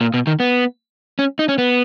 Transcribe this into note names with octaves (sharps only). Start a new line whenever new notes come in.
A#2
B2
D#3
B3
C#4
D#4
C#4
B3